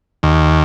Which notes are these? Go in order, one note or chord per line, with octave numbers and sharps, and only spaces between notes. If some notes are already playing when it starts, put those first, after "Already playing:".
D#2